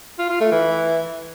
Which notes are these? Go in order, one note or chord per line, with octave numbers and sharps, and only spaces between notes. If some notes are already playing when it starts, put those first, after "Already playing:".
F4
F4
A3
E3